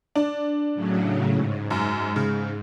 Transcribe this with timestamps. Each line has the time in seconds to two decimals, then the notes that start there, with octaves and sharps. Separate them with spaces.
0.16 D4
0.74 A2 C#3 F#3
1.34 G#2
1.71 F#2
2.16 C#3